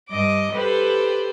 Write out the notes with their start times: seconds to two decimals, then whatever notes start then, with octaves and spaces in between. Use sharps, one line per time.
0.11 G2 D#5 D6
0.52 G4 A4 B4 C5